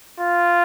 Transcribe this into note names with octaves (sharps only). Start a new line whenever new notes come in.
F4